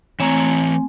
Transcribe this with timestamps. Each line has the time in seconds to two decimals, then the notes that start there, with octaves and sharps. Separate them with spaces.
0.20 E3 A3 C4 C#5 G#5 A#5